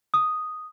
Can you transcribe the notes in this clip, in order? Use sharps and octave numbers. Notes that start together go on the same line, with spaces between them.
D#6